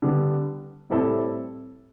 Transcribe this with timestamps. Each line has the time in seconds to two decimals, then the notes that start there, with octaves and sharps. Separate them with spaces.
0.02 D3 G3 B3
0.90 A2 G3 C4 E4 A4